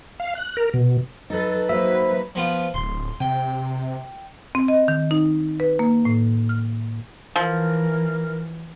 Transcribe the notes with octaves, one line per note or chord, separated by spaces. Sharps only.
F5
F#6
A#4
B2
F#3 D#4 A4 B4
F#3 A#3 D#4 F#4 B4 C5 E5
F3 B3 F4
D1 C6
C3 G5
C4
D#5
D#3
D#4
B4
A#3
A2
F6
E3 F3 A#4